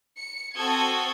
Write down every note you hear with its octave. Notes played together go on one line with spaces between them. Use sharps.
C#7
C4 F#4 A4 D#6 G#6